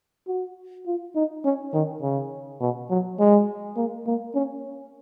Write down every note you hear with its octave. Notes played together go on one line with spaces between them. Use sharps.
F#4
F4
D#4
C#4
D#3
C#3
B2
F#3
G#3
A#3
A#3
C#4